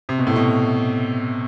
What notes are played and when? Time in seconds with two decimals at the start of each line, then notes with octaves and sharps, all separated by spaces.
0.09 C3
0.19 B2
0.27 A2
0.36 B2